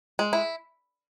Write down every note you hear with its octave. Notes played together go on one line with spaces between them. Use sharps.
G#3
E4